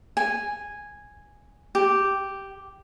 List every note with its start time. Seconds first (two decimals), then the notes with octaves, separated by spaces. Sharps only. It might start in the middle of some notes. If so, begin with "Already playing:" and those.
0.17 G#5
1.75 G4